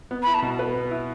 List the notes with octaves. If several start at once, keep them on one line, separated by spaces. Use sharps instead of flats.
B3
B5
E4
A5
B2
B4
B3
E4